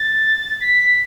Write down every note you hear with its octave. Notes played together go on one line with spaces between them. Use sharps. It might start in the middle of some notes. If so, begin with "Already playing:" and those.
Already playing: A6
B6